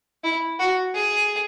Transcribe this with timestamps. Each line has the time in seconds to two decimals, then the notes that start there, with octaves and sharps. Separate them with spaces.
0.24 E4
0.59 F#4
0.95 G#4